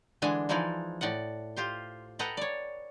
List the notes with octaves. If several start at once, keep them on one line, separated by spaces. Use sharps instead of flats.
D3 E3 G#3 D4 G#5
E3 F3 G#3 D#4 E4 D5
A2 D5 D#5 F#5
F4 G4 C5
A4 B4 D#5 F#5 G5 A#5
C#5 D5